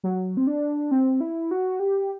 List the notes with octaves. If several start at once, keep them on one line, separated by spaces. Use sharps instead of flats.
F#3
C4
D4
C4
E4
F#4
G4